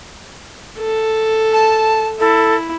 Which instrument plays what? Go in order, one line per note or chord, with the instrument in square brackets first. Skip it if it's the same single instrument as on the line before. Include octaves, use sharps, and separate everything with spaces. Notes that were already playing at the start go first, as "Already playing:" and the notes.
[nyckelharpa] A4
[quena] A5
[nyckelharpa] E4 [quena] A4